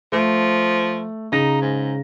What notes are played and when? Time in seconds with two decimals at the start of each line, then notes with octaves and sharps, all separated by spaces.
0.12 F3 A3
1.32 C#3 D#4 A#5 A#6
1.61 G#2